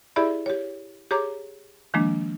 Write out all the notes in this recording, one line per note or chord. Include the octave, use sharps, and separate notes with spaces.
E4 G4 G#4 D5 E5 B5
G4 C#5
G4 G#4 C#5 A#5 D6
D#3 F3 G#3 A#3 D4